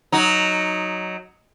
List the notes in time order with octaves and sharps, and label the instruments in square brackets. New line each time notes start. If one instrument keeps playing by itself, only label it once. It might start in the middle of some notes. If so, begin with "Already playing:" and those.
[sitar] F#3 D#4